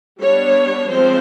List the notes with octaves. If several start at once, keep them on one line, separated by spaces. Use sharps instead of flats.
G3 B3 D4 C#5
F3 G#3 C4 C5